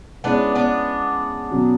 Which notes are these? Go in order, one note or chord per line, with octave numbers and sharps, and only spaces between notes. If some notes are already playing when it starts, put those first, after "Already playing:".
G#3 B3 C#4 D4 E4 G#4 C#5
B3 D4
B2 F#3 C#4